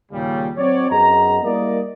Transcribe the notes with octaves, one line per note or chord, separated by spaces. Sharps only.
D#2 A#2 C#3 G3
F#3 C4 C#5 D5
F#2 B3 G#4 D#5 A#5
G3 A#3 E4 A#4 D5 D#5